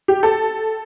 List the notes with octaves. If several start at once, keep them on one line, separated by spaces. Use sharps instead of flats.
G4
A4